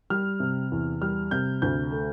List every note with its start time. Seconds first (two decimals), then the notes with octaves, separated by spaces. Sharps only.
0.10 G3 F6
0.40 C3
0.72 E2
1.01 G3 F6
1.31 C3 G6
1.62 D2 G6
1.92 A3